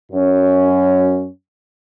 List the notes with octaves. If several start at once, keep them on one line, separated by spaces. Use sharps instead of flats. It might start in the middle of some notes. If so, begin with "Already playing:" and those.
F#2 C#4